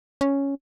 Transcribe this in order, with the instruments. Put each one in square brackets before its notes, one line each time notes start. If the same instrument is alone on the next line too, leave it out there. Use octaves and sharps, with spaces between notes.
[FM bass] C#4